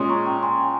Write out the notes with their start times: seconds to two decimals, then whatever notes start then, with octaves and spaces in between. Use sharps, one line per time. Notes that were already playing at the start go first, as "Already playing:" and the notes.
Already playing: A#2 G#3 C#4 C6 D#6
0.10 A#5 C#6
0.26 G5 A#5
0.42 G#5 C6